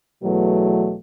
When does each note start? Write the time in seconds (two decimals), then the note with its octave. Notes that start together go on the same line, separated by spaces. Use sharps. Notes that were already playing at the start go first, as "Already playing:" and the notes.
0.20 E2 B2 F#3 A3